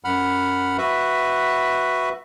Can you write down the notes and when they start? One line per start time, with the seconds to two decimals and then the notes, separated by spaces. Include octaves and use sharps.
0.04 F#2 F#5 B5 F6
0.78 F#4 B4 E5